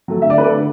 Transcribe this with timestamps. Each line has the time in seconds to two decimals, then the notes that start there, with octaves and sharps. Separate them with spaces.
0.08 F#3 A3
0.22 D3 E5
0.30 D5
0.37 A3 B4
0.44 A4 D5
0.52 D3